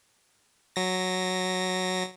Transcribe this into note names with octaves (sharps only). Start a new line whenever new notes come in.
F#3 A#6